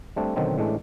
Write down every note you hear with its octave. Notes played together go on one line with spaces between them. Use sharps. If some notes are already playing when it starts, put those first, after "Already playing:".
G3 A3 C4 D4
B2 D3 D#3 F#3 C4
A2 E3 G#3 C#4 D4